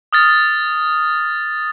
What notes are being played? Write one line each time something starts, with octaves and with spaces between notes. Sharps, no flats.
D#6 F6 A6